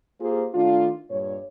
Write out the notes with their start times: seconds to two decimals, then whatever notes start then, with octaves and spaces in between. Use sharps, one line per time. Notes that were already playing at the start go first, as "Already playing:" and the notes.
0.20 A#3 F4 G4 G#4 C5
0.54 D#3 A3 D4 F4
1.10 G2 A#2 C#5